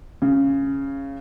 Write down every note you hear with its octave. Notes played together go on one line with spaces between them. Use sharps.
C#3